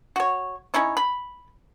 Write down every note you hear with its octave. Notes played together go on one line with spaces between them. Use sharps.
F#4 C#5
C#4 D#4 E4 C#5
B5